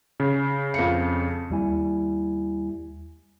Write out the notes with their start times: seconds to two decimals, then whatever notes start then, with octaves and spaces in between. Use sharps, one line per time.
0.20 C#3
0.74 F2 F5 C#7
1.50 D#2 G3 E4 G#5